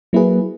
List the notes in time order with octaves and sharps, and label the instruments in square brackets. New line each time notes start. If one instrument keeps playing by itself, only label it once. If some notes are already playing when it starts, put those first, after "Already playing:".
[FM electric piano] F#3 A#3 E4 G#4 B4